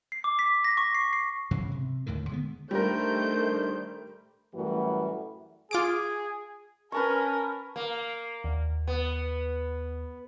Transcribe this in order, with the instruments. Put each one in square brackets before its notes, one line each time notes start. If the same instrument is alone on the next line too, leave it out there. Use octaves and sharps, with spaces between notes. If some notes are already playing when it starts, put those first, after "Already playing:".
[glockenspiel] C7
D6
B6
A#6
C#6
C7
C7
[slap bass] G#2 C#3 E3 F#3
C3
D#2 A2 D3 D#3
D3 G#3 A#3 B3
[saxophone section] D#3 D4 [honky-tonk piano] G3 A#4 [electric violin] A3 G6 [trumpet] C5
[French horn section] F#2 A2 E3 G3 A3 F#4
[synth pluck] F4 D6 D7 [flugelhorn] G#4
[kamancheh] C#4 A#4 [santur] B4 A5 C#6 [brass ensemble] G#5
[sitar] A#3
[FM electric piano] D#2
[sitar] B3